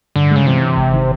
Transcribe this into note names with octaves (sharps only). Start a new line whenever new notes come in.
G2 D3
C#3 G#3
C3 E3
E3
G1
D#3